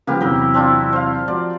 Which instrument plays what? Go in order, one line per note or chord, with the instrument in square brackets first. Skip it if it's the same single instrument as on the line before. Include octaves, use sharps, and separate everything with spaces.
[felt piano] C#3 F3 [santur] A#3 B3 G4 [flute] A#4
[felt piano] E2 C3 F#3 [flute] E4 [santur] A#4 G5
[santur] C4 D4 F4
C5 F5
[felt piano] F3 F#4 [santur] D5